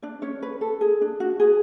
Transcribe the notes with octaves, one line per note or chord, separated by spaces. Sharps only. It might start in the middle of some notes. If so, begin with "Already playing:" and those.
D4 D5
C#4 C#5
B4
A4
G#4
D4
F#4
G#4